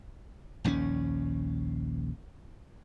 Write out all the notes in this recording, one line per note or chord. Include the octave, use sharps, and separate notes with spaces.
A#1 D#2 F3 C#4